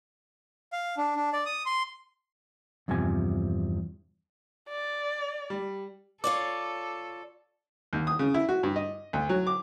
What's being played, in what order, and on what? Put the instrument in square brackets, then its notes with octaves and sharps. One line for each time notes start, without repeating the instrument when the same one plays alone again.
[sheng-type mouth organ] F5
D4
D4
D5
D#6
C6
[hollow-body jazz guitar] E2 G2 C3 F3 G#5
[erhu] D5
[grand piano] G3
[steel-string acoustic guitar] F4 C#5 D5 [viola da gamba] A4 [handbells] D6
[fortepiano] D#2
D#6
C#3
E4
F#4
G2
D#5
D2
F#3
D6